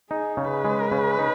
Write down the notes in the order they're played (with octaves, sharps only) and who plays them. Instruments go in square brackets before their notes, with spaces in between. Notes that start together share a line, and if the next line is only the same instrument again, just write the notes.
[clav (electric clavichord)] D#4 [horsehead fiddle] G#4
[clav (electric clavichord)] C#3
[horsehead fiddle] B4
[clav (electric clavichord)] G#3
C#3
D#4